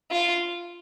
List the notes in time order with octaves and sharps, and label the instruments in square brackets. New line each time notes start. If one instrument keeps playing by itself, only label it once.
[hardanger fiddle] F4